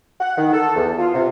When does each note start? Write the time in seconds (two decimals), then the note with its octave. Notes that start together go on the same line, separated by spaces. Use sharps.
0.21 F#5
0.38 D#3
0.53 A4
0.76 E2
0.99 F4
1.14 C3